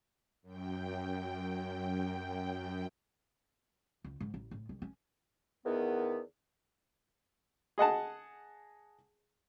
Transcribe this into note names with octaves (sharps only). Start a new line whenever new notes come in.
F#2 G5
C#2
G#2
A1
A2
C2
C#4
E2 D#3 B3
G#4 D#5 F#5 A5